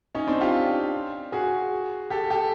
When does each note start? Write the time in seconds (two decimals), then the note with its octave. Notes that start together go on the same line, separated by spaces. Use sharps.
0.15 C#4 D#4
0.27 C4 D4
0.41 F4 G4
1.32 F#4 G#4
2.10 G4 A4
2.30 G4 A4